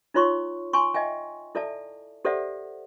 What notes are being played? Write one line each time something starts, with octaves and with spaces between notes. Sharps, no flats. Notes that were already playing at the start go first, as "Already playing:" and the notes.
D#4 F4 C#5 C6 C#6
G#5 C6 C#6
D#5 E5 G5 G#5
E4 A4 D5 E5 A5
G4 A4 C5 D5 E5 F#5